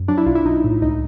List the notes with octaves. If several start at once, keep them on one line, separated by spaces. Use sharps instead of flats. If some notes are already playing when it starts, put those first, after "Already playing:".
Already playing: F#2
F#3 D4
E4
B1 F4
E4
B1 D#4
A2
C#2 D#4